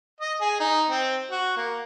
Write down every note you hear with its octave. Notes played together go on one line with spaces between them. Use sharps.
D#5
G#4
D#4
C4
F#4
A#3